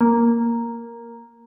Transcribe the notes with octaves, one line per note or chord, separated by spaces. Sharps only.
A#3